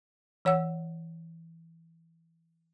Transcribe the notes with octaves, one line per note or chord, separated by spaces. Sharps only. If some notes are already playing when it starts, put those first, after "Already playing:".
E3 C#5 F#5 E6